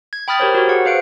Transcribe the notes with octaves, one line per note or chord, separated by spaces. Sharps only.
G#6
G5 B5 D#6 F6 A6
G4 A#4 C5 C#5
F#4 A#4 C5 C#5
G#4 F#5
B4 C5 F5 C#7 D7